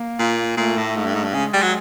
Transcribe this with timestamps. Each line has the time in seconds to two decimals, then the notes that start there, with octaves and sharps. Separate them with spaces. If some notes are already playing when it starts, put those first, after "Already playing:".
Already playing: A#3
0.19 A#2
0.57 A#2 A3
0.77 A2
0.96 G#2
1.06 G2
1.15 G#2
1.24 G2
1.34 C#3 G#3
1.54 G3
1.62 F#3